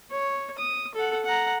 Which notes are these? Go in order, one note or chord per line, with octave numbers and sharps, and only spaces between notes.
C#5
D#6
A4 F#5
F#5 A#5